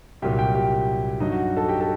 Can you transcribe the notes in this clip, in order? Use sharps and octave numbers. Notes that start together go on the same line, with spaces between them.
C2 A#2 F#3 G4 G5
G4 G5
G4 G5
G2 F#3 D#4 D#5
F#4 F#5
A4 A5
G4 G5
A4 A5